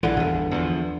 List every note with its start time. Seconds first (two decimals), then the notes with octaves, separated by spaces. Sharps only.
0.03 A#1 D3 E3
0.17 G1 E2
0.51 E2 F3